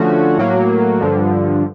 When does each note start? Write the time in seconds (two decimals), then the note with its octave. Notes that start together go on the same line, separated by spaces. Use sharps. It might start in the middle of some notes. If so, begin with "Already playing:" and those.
Already playing: D3 F3 A3 C#4 F#4
0.38 A2 F#3 A#3
1.01 G2 D3 F3